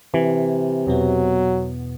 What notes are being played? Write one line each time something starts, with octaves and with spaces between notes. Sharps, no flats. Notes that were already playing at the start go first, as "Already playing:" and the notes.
C3 E3
E2 B2 F#3 B3